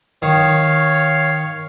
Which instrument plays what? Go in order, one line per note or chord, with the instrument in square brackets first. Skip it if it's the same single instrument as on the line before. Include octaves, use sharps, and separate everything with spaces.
[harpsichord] D#3 [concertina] C#5 F5